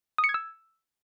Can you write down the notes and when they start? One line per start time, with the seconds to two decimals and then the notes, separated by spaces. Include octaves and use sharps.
0.18 D#6
0.24 C#7
0.29 G#6
0.34 E6